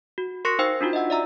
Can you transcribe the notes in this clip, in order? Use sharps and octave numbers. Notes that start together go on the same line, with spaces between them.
F#4
A#4 C6 C#6 F#6 A#6 C#7
D#4 C5 F5 G5 E6
D4 D#4 F4 F#4
D#5 E5 F#5 E6
D5 E5 A#5 E6